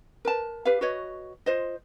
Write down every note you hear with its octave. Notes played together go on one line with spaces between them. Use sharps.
A#4 B4 A5
G4 B4 F5
F#4 B4 C#5 D#5
F4 C5 D#5